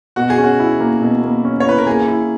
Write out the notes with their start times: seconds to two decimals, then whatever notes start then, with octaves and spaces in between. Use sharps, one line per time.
0.16 B2 F#4
0.30 G#4
0.38 C#4
0.44 F#4
0.59 E4
0.80 A#3
1.02 B2
1.23 A#3
1.45 C#4
1.60 C#5
1.66 E4 B4
1.78 A#4
1.86 A#3 G#4
2.07 E4